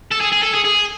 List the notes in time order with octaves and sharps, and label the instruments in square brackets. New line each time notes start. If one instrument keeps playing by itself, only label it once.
[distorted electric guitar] A4
G#4
G#4
A4
G#4
G#4